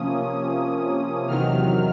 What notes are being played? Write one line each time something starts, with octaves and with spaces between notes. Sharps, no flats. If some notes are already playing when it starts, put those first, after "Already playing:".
Already playing: C3 F3 A#3 C#4 D#6
E2 C3 D#3 F#3 F6